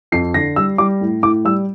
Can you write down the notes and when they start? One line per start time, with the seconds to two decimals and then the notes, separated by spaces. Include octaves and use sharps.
0.12 F2 C7
0.34 D3 A#6
0.56 G3 E6
0.78 G3 D6
1.01 A2
1.23 A2 D6
1.45 G3 E6